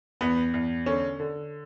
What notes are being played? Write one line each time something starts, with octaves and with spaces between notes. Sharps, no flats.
E2 B3
E2
D3 C#4
D3